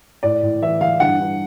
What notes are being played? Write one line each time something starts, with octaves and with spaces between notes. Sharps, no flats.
A2 D5
A2
E3 E5
E3 F5
G2 F#5
G2